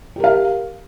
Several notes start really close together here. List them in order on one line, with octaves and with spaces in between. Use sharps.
G4 A#4 F5